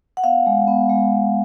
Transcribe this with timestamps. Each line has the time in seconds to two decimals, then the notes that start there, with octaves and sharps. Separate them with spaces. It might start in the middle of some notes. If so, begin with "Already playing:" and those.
0.17 F#5
0.24 B3 F5
0.47 G#3
0.68 B3
0.89 G#3
1.12 B3